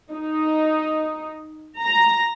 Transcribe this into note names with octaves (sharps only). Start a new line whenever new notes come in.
D#4
A#5